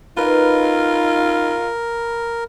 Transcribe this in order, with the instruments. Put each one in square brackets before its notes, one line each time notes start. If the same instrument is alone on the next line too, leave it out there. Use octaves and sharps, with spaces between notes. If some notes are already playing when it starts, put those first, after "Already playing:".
[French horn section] D#4 [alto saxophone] F4 [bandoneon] A#4 [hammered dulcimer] B4 F5